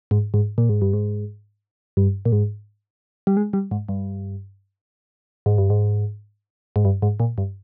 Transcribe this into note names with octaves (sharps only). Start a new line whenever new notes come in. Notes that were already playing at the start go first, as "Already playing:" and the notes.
G#2
G#2
A#2
G#2
G2
G#2
G2
A#2
G#2
G3
G#3
G3
G#2
G2
G#2
G2
G#2
G#2
G2
G#2
A#2
G2